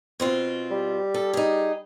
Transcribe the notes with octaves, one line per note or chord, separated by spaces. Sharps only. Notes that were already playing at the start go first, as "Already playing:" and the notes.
B2 C4 F4
G3
A4
D#4 G#4